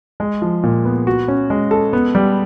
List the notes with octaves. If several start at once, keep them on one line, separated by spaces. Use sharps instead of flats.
G#3
F3
A#2
B3
F#4
C#4
G#3
A4
B3
G3